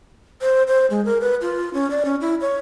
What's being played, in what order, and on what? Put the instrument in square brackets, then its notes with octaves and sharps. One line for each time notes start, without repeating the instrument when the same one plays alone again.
[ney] C5
C5
G#3
A#4
B4
F4
C#4
D5
C#4
E4
C#5